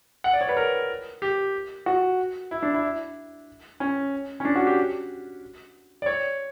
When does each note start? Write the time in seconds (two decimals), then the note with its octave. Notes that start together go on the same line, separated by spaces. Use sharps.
0.24 F#5
0.33 D5
0.41 C#5
0.49 B4
0.57 A#4
1.22 G4
1.86 F#4
2.51 E4
2.63 D4
2.74 E4
3.80 C#4
4.40 C#4
4.45 D4
4.56 F#4
4.67 G4
6.02 D5
6.06 C#5